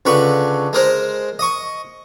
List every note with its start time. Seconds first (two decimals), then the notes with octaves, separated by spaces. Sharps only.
0.05 C#2 D3 B4 C#6
0.73 G#3 A#4 C5
1.39 D#5 C#6